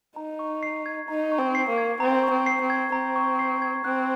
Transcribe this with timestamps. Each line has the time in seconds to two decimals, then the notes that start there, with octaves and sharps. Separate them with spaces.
0.16 D#4 A#5
0.39 C#6
0.63 C7
0.86 G#6
1.08 D#4 A#5
1.32 C#6
1.39 C4
1.55 C7
1.69 A#3
1.78 G#6
2.00 C4 A#5
2.24 C#6
2.31 C4
2.46 C7
2.62 C4
2.70 G#6
2.92 C4 A#5
3.16 C#6
3.39 C7
3.62 G#6
3.84 C4 F#6